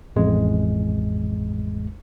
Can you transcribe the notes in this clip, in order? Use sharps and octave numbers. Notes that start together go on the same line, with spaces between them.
A1 F2 G#3